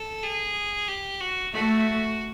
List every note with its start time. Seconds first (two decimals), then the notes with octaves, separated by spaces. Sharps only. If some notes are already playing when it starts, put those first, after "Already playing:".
Already playing: A4
0.23 G#4
0.88 G4
1.20 F#4
1.53 A3 F#4